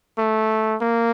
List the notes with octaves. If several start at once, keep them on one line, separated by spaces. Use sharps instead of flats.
A3
A#3